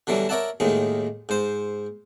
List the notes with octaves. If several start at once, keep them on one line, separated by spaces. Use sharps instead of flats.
B2 D3 E3 F#3 G3
A#4 C#5 D5 E5 F#5 A5
D#2 A2 D#3 G#3
G#2 C5